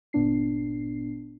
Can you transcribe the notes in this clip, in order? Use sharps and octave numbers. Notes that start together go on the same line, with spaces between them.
G1 A#2 B3 D4 C7